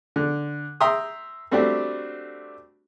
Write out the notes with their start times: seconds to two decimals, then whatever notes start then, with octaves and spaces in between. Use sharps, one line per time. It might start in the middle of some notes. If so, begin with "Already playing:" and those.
0.16 D3
0.80 E5 G5 A#5 C6 D#6
1.51 G3 A3 C4 D4 F#4 G4